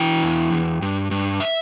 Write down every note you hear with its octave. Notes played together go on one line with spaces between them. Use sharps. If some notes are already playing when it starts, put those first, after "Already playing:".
Already playing: E3 G5
E2
E2
G2
G2
E5